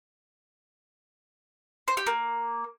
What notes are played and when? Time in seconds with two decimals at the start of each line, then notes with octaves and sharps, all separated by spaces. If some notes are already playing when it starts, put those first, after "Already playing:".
1.88 C5
1.97 G4
2.07 A#3